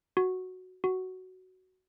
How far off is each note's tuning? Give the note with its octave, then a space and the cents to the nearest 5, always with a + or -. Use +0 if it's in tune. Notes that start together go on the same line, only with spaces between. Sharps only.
F#4 +0
F#4 +10